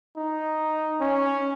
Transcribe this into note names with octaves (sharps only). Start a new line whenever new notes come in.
D#4
C#4